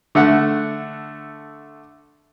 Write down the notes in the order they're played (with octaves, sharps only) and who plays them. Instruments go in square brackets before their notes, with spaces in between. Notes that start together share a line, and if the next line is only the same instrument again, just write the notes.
[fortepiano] D3 A3 F#5